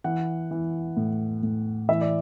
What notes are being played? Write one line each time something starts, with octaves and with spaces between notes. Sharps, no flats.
E3 F#5
E3
A2
A2
E3 E5
D5